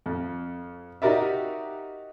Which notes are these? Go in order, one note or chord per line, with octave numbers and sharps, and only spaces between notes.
F2
D#4 F#4 G4 A#4 D5 E5